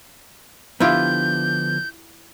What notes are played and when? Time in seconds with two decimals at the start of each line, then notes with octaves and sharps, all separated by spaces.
0.80 D3 F3 B3 E4 F4 G4 G6